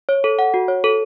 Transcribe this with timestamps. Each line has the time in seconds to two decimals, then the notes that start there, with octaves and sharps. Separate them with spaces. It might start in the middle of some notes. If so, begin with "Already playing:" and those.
0.09 C#5
0.24 A4
0.39 F#5
0.54 F#4
0.68 C#5
0.84 A4